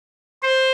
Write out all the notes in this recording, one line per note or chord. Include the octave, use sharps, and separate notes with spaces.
C5